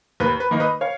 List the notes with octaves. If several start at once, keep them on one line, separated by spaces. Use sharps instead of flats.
D#2 B4
B4
D#3 A#3 D#4
B4 D#5
C#5 F5